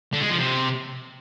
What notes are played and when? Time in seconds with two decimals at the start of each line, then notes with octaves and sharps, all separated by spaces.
0.13 D3
0.21 G#3
0.29 F3
0.38 C3